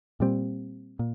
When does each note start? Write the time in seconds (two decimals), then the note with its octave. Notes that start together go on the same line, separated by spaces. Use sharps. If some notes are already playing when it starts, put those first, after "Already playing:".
0.20 A#2 G3 C4
0.99 A#2